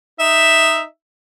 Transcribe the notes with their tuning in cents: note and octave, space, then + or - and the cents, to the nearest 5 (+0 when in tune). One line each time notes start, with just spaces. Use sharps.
D#4 +0 E5 +0